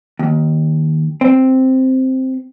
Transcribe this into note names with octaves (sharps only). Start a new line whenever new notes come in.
D#2
C4